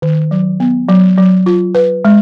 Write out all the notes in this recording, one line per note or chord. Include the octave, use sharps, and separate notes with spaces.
D#3
F#3
B3
F#3
F#3
F4
B4
G#3